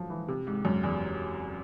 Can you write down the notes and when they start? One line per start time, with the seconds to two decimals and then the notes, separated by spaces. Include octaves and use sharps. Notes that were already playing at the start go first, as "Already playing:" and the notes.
Already playing: F3 F#3
0.10 E3
0.28 C3
0.47 G#2
0.65 F#2
0.83 E2